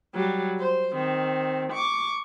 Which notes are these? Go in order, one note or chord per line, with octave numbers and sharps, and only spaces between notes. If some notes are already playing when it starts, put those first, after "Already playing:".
F#3 G3
C5
D#3 C4
C#6 D6